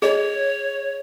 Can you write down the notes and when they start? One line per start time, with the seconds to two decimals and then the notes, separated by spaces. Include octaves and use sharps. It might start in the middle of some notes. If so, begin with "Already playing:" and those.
0.02 G#4 C#5 D#5